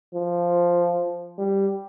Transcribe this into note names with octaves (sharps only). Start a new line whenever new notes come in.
F3
G3